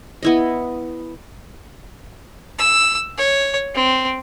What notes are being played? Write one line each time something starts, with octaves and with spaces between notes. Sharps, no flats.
B3 E4 D#5
E6
C#5
C4